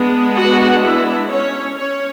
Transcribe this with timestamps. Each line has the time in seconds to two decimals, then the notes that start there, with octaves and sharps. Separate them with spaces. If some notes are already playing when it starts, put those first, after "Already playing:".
Already playing: G#3 B3 D4
0.36 F#4 F#5
0.83 E4 E5
1.30 C#4 C#5
1.77 C#4 C#5